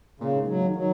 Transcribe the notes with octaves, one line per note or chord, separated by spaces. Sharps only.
A#2 C#3
G#2
G#2 F#3
D#3
D#3 F#3